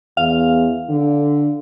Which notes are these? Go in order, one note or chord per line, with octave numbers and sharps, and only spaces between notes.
E2 F5
D3